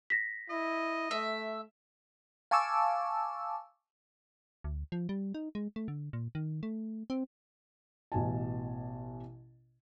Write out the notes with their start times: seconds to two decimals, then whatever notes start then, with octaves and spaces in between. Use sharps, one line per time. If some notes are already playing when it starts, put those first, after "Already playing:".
0.10 A#6 B6
0.50 E4 D#5
1.11 A3 E5
2.51 F5 G#5 A5 C#6 D6 E6
4.64 D2
4.92 F3
5.09 G3
5.34 D#4
5.55 G#3
5.76 A3
5.88 D3
6.13 A#2
6.35 D#3
6.63 A3
7.10 C4
8.12 A1 B2 G#5 A5